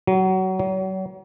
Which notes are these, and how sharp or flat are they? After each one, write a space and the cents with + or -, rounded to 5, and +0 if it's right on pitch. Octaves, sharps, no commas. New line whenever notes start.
F#3 +25
F#3 +40